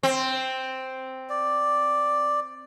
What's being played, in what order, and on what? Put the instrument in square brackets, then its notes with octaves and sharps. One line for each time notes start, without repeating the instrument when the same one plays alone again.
[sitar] C4
[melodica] D5